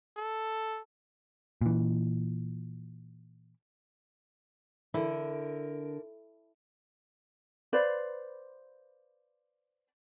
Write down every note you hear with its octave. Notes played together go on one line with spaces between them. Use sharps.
A4
A#2 E3
D3 E3 E4 A#4
B4 C5 D5 F5